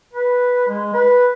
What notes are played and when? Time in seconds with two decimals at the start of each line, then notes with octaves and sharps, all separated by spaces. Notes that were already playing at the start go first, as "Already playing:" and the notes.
0.13 B4
0.68 G#3
0.94 B4